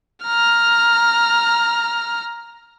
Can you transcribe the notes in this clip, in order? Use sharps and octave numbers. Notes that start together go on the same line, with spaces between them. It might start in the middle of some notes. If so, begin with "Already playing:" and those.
A#5 F6